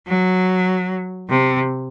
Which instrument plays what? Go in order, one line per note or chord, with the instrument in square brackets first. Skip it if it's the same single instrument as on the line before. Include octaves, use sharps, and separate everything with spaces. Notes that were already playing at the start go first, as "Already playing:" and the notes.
[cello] F#3
C3